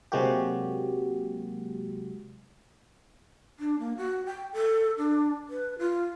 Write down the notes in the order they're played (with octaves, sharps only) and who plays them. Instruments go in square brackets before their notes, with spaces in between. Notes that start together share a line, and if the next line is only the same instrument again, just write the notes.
[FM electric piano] C3 F#3 G#3 A#3 F#4 G4
[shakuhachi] D4
A#3
F#4
G5
A4
D4
B4
F4